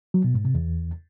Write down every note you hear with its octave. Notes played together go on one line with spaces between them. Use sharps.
F#3
B2
G#2
C3
E2